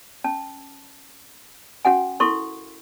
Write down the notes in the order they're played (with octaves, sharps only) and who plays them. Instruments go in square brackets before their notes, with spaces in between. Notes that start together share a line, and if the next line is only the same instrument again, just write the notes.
[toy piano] C#4 A5
C#4 F#4 F#5 G#5
E4 A4 A#4 C6 C#6